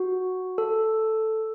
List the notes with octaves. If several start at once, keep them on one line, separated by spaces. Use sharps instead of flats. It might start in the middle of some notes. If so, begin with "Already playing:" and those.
Already playing: F#4
A4